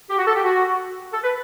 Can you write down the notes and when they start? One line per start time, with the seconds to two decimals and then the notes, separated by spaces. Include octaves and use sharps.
0.10 G4
0.18 F#4
0.27 A4
0.35 G4
0.44 F#4
1.13 A4
1.24 B4